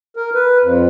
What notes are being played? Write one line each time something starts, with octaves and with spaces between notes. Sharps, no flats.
A#4
B4
F2